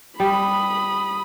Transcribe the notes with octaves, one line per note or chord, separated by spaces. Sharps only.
G3 B5 D#6